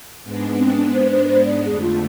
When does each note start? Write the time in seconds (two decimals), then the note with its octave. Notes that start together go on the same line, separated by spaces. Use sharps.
0.23 G#2 G#3 B3 D4
0.58 C4
0.76 D4
0.94 C5
1.11 C5
1.24 B4
1.29 C5
1.46 D5
1.64 F2 D3 A3 G#4
1.82 F4